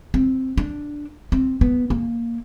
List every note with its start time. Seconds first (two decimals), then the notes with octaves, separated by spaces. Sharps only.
0.14 C4
0.58 D4
1.32 C4
1.61 B3
1.90 A#3